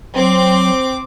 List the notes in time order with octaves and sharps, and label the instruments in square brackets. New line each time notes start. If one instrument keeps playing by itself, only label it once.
[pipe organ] F#3 [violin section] C4 D6